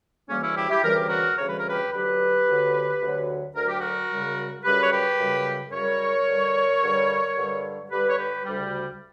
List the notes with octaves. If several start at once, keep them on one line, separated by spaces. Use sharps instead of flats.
D2 C#3 E3 G3 A#3 C#4
C#4 E4
E4 G4
E4 G4
D2 C#3 E3 G3 A#4
G4
F#4 A#4
D2 C#3 E3 G3 C#5
B4
A#4
G4 B4
D2 D3 F#3 G4 B4
D2 D3 F#3
D2 D3 F#3
D2 D3 F#3 A#4
G4
F#4 A#4
F#2 C#3 G3
F#2 C#3 G3 G4 B4
C#5
G4 B4
F#2 C#3 G3
F#2 C#3 G3 A#4 C#5
G2 D3 G3
G2 D3 G3
G2 D3 G3
G2 D3 G3 G4 B4
C#5
G4 B4
D2 C#3 G3